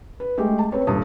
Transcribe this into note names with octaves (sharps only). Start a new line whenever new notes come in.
B4
G#3 A3 G4 G5
A5
C4 B4 C#5
D#1 G2 A4 A5 D#6